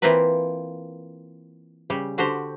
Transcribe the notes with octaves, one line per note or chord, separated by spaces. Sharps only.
E3 A#3 C4 F4 A#4 B4
C#3 G3
D3 F#4 G4 C5